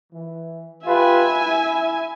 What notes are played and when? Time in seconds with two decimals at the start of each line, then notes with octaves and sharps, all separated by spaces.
0.12 E3
0.85 F4 G4 B4 E5 G#5
1.35 E4